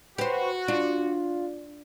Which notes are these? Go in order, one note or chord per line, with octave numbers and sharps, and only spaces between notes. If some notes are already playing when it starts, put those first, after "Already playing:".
F#4 G4 B4 C5
D4 F4